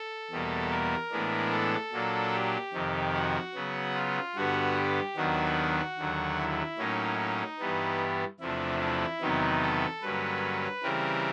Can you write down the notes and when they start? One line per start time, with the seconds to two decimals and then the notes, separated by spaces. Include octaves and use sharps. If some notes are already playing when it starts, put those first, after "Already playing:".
Already playing: A4
0.31 E2 B2 G3 A#3
0.71 A#4
1.11 A2 E3 G#3 B3 D4
1.52 A4
1.92 A#2 F#3 A#3 D4
2.33 G4
2.73 F2 C3 D#3
3.14 F#4
3.54 C#3 F#3 B3
3.95 F4
4.35 G2 D3 G3 B3 F#4
4.76 G4
5.16 D#2 D#3 F#3 B3 D4 F#4
5.98 D#2 D3 F#3
6.38 E4
6.78 A2 F#3 A#3 C#4 D#4
7.19 D#4
7.59 G2 E3 G3 B3
8.40 E2 C3 F3 A3 D4 E4
8.80 E4
9.21 E2 C3 D#3 F#3 B3 D#4
9.62 A4
10.02 G2 D3 F#3 A#3 C#4 B4
10.83 C#3 E3 G3 C4 A#4